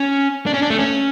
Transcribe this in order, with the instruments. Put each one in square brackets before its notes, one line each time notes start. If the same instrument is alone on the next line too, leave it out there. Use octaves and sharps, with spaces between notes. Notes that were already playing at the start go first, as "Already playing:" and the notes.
Already playing: [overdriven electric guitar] C#4
D4
C#4
D4
A3
C#4